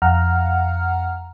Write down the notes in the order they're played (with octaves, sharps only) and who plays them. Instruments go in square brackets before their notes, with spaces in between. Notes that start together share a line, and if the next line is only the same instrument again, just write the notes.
[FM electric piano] F2 F5 F#5 A#5 F6